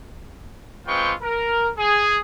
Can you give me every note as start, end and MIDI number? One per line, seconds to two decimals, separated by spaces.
0.87 1.13 56
0.87 1.13 60
0.87 1.13 65
0.87 1.13 71
0.87 1.13 79
0.87 1.13 85
1.22 1.70 70
1.77 2.20 68